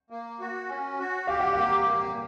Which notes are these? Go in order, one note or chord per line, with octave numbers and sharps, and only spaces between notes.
A#3
F#4
C#4
F#4
G4 F5
F#5
A#3 F5
A#3